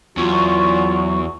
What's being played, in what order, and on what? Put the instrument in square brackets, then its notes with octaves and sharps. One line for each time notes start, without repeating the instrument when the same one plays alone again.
[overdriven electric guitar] E2 [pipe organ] F#3 [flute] F4 [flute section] C#6